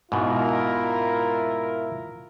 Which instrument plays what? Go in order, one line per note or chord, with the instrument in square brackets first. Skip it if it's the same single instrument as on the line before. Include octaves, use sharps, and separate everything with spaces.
[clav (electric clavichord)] G#2 B2 [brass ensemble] E4 F4 A#4